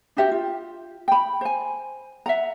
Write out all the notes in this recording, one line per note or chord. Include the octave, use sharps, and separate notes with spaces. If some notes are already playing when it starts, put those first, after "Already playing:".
D4 F#4 G4 E5
F4
G5 B5
C5 G#5
E5 F#5 A#5